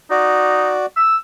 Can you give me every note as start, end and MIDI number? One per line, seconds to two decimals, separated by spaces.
0.11 0.74 63
0.11 0.86 66
0.11 0.86 74
0.96 1.16 88